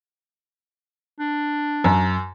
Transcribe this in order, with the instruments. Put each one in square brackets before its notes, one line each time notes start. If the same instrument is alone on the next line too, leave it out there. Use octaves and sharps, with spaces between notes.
[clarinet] D4
[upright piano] F#2